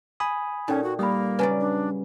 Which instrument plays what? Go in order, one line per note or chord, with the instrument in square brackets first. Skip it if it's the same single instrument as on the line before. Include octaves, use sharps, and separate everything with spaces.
[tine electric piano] G#5 B5 D#6
[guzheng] A#2 [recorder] C#4 [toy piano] D#4 A4 G5
[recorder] F#4
[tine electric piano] G3 [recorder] A#3 [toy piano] B5 D#6
[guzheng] C#3 F#3 D5 [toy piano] B4 G#5
[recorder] D4